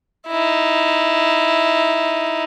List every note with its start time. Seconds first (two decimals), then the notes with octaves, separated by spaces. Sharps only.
0.28 D#4 E4